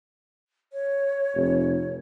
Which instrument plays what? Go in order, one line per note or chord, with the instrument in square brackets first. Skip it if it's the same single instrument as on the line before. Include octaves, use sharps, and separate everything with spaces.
[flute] C#5
[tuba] F1